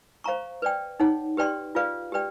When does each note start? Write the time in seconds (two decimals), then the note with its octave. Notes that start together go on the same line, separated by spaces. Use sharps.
0.24 C5 F5 A#5 C#6
0.62 B4 D5 G5
1.00 D#4 G#4 C#5 F#5
1.37 G4 B4 D5 G5 C6
1.75 F4 G#4 B4 D5 F5
2.12 G4 B4 D5 G5